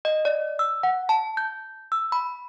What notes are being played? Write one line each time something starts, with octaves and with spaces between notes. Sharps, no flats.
D#5
D5
E6
F#5
A5
G6
E6
B5